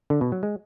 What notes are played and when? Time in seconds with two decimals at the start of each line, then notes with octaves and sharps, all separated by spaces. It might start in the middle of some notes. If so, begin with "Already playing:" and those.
0.10 D3
0.21 B2
0.32 F#3
0.43 G#3